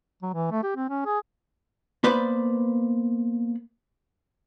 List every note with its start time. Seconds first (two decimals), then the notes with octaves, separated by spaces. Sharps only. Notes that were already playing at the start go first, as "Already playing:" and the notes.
0.22 F#3
0.34 E3
0.51 A3
0.63 G4
0.76 C4
0.89 C#4
1.05 G#4
2.04 A#3 B3 B4 C5 D5 B5